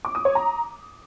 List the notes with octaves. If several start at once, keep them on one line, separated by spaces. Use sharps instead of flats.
D6
D#6
C#5
A#5